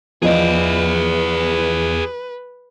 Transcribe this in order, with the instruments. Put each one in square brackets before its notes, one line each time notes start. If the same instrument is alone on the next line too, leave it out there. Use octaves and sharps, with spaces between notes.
[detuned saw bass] E2 [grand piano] F3 F4 D#5 [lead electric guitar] G#4 D5 [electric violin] B4